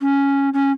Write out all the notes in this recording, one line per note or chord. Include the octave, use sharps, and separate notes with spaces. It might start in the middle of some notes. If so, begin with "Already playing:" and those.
C#4
C#4